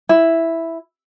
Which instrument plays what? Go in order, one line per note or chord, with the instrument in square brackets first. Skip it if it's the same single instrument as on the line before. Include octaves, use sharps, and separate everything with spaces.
[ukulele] E4